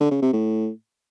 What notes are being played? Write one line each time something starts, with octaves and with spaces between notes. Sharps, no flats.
D3
C#3
C3
A2